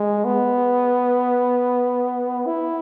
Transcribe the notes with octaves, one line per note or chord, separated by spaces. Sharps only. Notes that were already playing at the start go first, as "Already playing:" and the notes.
Already playing: G#3
B3
E4